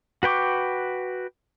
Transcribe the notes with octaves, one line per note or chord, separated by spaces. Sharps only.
F#4 B4 G5 C#6 D6